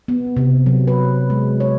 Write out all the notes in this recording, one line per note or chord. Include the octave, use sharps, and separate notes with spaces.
B3
C3
F#3
B4
G#3
C#5